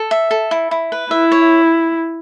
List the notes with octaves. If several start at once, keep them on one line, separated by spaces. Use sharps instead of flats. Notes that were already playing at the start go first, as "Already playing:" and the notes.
Already playing: A4
E5
A4
E4
E4
B4
E4 E5
C#5